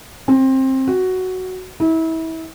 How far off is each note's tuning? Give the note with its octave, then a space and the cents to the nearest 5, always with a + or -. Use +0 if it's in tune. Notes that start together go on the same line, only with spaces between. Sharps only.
C4 +20
F#4 +5
E4 -30